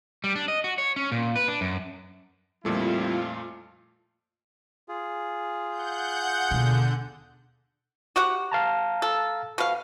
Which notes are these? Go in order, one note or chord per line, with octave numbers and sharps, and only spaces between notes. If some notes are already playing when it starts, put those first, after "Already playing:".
G3
D4
D#5
F#4
C#5
C#4
A#2
B4
D4
F#2
F2 A#2 G3 A3 C4 E4 F4
F4 G#4
F#5 G6
D#2 B2 D3
F#4 G4 F#5
F5 A5 A#5
A4
B2 F5